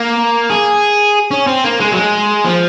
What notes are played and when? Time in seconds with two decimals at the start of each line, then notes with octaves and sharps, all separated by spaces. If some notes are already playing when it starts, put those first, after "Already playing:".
Already playing: A#3
0.50 G#4
1.31 C#4
1.47 C4
1.64 A#3
1.80 G#3
1.92 F#3
1.96 G#3
2.45 F3